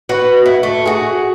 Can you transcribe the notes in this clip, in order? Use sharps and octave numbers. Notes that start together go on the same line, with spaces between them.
F#4 B4
E4
A3
F#4 G#4